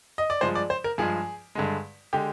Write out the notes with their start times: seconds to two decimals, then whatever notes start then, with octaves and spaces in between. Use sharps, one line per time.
0.18 D#5
0.30 D5
0.41 G2 F3 G#3 C5
0.55 D5
0.70 C5
0.84 A#4
0.98 G2 F3 G#3 G#4
1.55 G2 D3 G#3
2.13 D3 G#3 G4